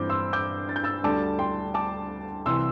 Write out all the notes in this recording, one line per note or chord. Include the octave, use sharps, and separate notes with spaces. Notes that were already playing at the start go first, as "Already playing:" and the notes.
Already playing: G2 E3 C4 D6 G6
C6 E6
D6 G6
A6
G6
E6 A6
D2 D3 G3 A5 D6
G5 C6
A5 D6
C2 C3 E3 C6 E6